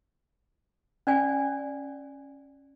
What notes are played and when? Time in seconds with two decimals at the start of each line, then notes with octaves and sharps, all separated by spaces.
1.07 C#4 D5 G#5